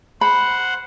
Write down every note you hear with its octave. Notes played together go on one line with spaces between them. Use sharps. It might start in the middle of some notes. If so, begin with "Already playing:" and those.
C5 F#5 B5